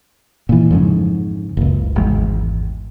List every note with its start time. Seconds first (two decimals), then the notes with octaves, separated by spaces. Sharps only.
0.49 A#2 E3
0.71 F2 G#2 C#3
1.57 F#1 C#2
1.96 G#1 E2 G#3